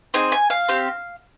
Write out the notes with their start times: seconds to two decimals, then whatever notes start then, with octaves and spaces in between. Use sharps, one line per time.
0.14 C4 D#4 G#4 G#5
0.32 G#5
0.50 F5
0.68 C4 G4